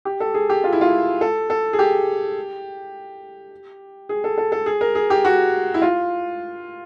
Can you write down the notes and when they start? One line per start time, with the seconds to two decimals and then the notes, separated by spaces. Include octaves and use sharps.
0.05 G4
0.20 A4
0.34 G#4
0.50 G4
0.64 F4
0.73 E4
0.81 F4
1.21 A4
1.50 A4
1.73 G#4
1.79 G4
4.09 G#4
4.24 A4
4.38 A4
4.52 A4
4.66 G#4
4.81 A#4
4.95 G#4
5.10 G4
5.25 F#4
5.74 E4
5.82 F4